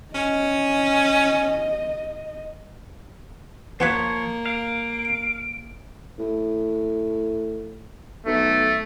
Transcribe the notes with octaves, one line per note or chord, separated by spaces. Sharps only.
C#4 D#5
F3 A#3 B3 F4 B4 C#5
F5 D7
A2
B1 A3